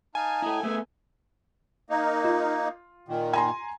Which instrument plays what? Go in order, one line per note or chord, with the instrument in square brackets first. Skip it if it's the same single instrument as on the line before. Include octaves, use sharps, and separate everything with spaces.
[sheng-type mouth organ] D#4 F5 A5 [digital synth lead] G#5
[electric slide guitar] E4 A4 [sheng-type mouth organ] D#5 A#5
[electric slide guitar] A3 B3 [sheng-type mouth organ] G#4 E5
[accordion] A#3 D#4
[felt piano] F4
[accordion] A#2 D#3
[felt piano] G#5 A#5 C6